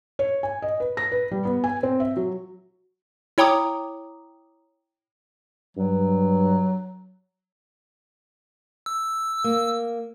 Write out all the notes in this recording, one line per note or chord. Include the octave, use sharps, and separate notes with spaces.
C#5
G#5
D#5
B4
A#6
B4
G3
B3
G#5
C4
E5
F#3
E4 C#5 G5 A#5 D6 D#6
G2 F#3
E6
A#3